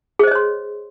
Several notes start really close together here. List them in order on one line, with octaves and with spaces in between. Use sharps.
G#4 C5 D#5 C#5 C6